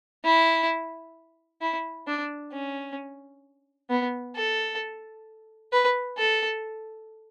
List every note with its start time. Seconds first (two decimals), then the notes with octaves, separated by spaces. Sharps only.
0.24 E4
1.61 E4
2.07 D4
2.52 C#4
3.90 B3
4.35 A4
5.72 B4
6.17 A4